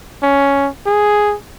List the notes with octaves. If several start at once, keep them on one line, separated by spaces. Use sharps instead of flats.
C#4
G#4